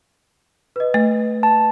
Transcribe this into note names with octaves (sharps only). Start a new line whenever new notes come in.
B4 D#5
A3
A5